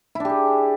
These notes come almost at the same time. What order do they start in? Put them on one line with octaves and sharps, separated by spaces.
E4 D4 G4 G#4